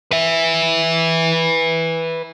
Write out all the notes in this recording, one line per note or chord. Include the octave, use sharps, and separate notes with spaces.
B4 E5